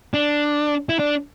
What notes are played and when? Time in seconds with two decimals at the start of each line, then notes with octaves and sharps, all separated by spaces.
0.14 D4
0.89 E4
0.99 D4